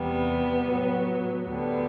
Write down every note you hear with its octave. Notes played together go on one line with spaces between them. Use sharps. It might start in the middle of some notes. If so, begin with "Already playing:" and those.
Already playing: E2 C3 G3 B3
A2 F#3
D2 D3 G3 B3